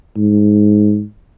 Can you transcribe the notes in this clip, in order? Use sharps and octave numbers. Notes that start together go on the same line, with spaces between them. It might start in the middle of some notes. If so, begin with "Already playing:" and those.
G#2